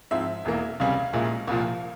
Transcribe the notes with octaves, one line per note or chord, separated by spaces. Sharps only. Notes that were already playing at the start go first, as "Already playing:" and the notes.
G#2 F3 C4 E4 E5
E1 E2 E3 A#3
C#2 C3 G3 C#4 F5
A#1 A#2 G#3 E4
C2 A#2 F3